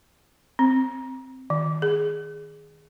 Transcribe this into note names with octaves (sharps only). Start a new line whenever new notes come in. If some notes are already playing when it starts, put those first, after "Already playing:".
C4
D#3
G#4